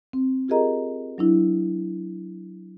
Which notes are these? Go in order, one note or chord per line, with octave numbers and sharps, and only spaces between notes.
C4
F4 G4 G#4 A#4 D#5 A#5
F#3 D4 E4